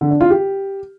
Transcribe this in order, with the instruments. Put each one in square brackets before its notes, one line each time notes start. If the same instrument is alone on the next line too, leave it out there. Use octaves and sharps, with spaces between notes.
[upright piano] D3
D4
F4
G4